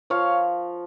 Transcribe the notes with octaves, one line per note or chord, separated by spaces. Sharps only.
F3 C#5 F5